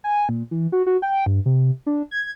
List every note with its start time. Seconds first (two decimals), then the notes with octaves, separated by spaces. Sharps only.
0.04 G#5
0.29 A#2
0.51 E3
0.72 F#4
0.86 F#4
1.02 G5
1.26 G2
1.46 C3
1.86 D4
2.11 G#6